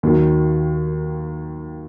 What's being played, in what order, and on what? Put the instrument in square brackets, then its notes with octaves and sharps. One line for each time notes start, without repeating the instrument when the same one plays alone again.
[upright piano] D#2 D#3 F#3